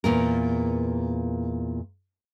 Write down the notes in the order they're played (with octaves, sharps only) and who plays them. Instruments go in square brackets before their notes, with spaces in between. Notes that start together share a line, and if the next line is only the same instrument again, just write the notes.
[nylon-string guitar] E2 A#2 A#4